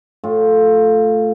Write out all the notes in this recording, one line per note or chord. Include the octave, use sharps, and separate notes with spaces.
A2 F4